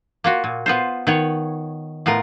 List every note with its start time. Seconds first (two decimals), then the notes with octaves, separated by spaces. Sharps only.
0.24 A#3 F4 F#4
0.44 A#2
0.66 B3 F4 C5
1.07 D#3 B3 C#5
2.06 A2 B3 F4 A#4